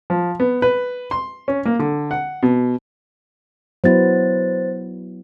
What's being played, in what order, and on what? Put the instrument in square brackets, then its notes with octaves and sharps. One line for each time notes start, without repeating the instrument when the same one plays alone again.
[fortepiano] F3
B3
B4
C6
C#4
A#3
D3
F#5
B2
[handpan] F#3 B3 E4 [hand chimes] C5 A6